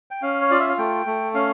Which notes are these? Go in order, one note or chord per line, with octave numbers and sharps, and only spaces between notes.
G5
C#4 F5
C#5
F4 D5
E5
F5
A3 G5
A3
C#4 F5